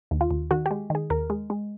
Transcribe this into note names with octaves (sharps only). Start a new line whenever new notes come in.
D#2
F4
D#2
D#3 F#4
G4
G#3
D#3 G#4
D#2 A#4
G#3
G#3